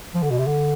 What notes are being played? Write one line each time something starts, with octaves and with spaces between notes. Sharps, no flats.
F3
D3
B2
C3
D3